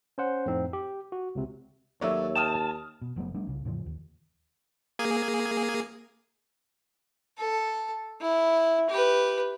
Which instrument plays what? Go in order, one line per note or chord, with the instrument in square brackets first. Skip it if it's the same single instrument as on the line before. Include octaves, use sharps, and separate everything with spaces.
[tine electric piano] C#4 C5 F#5
F2 A2 C4 D#4
G4
F#4
C#2 C3
[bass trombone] D#2 [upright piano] F#3 A3 D5 [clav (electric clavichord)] C#5 E5
[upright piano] G5 D#6 F6 [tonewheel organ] A5
[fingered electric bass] B2
F#1 F#3 A3 B3
G3 A3 B3 D4
C2 C#3
E2 A2 C#3 F3
D#2
[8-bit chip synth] A#3 G#4 G#5
[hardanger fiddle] A4
E4
G4 B4